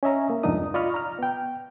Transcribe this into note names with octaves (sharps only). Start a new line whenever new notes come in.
C#4 D#5 E5 A#5
A#3
C2 F2 G#2 D4 D#4 D#6
F4 D5 D#5 B5 C#6 F6
A#5 F6
B3 G5